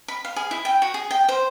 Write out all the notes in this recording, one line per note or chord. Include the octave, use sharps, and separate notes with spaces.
B5
F5
G#4
E4
G5
F#4
G#4
G5
C5